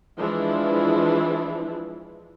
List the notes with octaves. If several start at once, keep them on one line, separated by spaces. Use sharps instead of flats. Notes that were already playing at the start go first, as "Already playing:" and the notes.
E3 F3 G#3 D4 E4